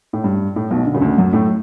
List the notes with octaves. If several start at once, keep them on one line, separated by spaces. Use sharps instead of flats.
A2
G2
A2
B1 B2
D3
C#3
D2 D3
F#2 F#3
A2 A3